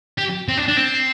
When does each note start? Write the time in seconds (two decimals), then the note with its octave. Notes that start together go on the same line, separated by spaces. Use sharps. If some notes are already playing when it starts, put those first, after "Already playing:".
0.18 G4
0.48 C4
0.57 D4
0.68 D4
0.77 C4